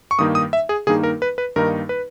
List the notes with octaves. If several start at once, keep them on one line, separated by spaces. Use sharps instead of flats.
C#6
G2 D#3 A#3 D#4 D#6
D#6
E5
G#4
G2 D#3 A#3 D#4 G#4
A#4
B4
B4
G2 D#3 A#3 D#4 A#4
B4